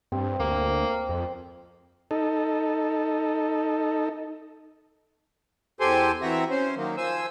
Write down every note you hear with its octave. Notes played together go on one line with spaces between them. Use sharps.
G2 C4
D2 A#3
F2
D#4 A4
E2 G4 A4 C5 G#5 C6
E3 C4 F#4 E5 A#5
C#4 C5
D#3 F#3 A#3
F3 C5 G#5 E6